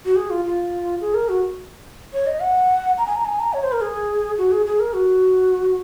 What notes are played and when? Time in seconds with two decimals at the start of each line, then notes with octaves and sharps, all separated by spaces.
0.05 F#4
0.16 G#4
0.30 F4
0.45 F4
1.01 G#4
1.15 A#4
1.29 F#4
2.13 C#5
2.27 D#5
2.41 F#5
2.98 A#5
3.06 G#5
3.16 A#5
3.25 G#5
3.40 A#5
3.53 C#5
3.63 C5
3.72 A#4
3.81 G#4
4.38 F#4
4.52 G#4
4.66 G#4
4.80 A#4
4.94 F#4